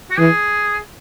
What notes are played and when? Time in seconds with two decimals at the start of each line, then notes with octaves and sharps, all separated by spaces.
0.11 F#4
0.19 E3 G#4